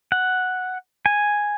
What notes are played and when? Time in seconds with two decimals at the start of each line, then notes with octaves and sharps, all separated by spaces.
0.12 F#5
1.06 G#5